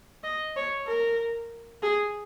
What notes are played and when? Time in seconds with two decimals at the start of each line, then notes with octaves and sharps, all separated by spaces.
0.23 D#5
0.56 C#5
0.87 A#4
1.83 G#4